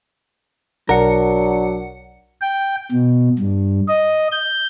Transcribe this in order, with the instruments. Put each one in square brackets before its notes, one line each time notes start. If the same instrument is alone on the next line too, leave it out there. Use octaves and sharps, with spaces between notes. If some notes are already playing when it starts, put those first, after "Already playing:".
[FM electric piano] B1 F#5 C#7 [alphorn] F#3 [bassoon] D4 [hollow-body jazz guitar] A#4
[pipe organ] G5
B2
G2
D#5
G6